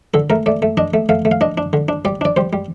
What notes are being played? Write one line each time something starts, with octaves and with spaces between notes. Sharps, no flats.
D3 A4
A3 A#4
A3 D5
A3
D4 D#5
A3
A3 F5
A3
F5
D4 D#5
D4
D3
D4
G3 D5
D4 D5
G3 C5
G3